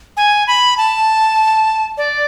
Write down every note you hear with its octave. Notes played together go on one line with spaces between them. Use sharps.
G#5
B5
A5
D5